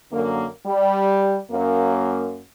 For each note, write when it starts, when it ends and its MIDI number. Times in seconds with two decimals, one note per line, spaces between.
0.12 0.45 42
0.12 0.45 50
0.12 0.45 58
0.66 1.36 55
1.51 2.40 42
1.51 2.40 58